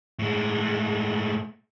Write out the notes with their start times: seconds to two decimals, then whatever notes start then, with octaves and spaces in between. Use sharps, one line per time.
0.19 A2 G#3